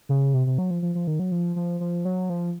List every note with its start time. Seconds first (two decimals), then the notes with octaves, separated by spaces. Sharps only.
0.09 C#3
0.34 C3
0.47 C3
0.58 F#3
0.71 F3
0.82 F3
0.95 F3
1.07 D#3
1.19 F#3
1.32 F3
1.56 F3
1.80 F3
2.05 F#3
2.30 F3